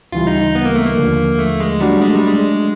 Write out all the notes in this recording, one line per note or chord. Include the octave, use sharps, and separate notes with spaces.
D2 C#3 E3 G3 F4
D#4
D#4
B3
A#3
A3
A#3
D#2 D3 F3
A3
G#3
F#3 G3 A3 D4 F#4
G#3
G3
G#3